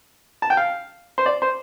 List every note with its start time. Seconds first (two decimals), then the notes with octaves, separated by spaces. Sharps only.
0.42 A5
0.50 G5
0.57 F5
1.18 C5
1.26 D5
1.42 C5